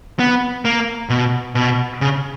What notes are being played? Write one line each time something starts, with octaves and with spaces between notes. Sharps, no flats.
B3
A#3
B2
B2
C#3